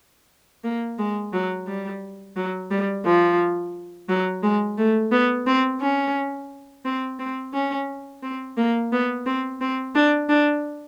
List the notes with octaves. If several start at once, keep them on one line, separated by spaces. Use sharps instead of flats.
A#3
G#3
F#3
G3
F#3
G3
F3
F#3
G#3
A3
B3
C4
C#4
C4
C4
C#4
C4
A#3
B3
C4
C4
D4
D4